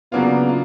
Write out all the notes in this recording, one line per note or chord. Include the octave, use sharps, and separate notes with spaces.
C#3 F#3 A#3 B3 D4 F4
F4